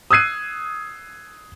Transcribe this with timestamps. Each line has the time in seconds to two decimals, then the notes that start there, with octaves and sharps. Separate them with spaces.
0.11 D#6 E6 F#6 G#6 C7 D#7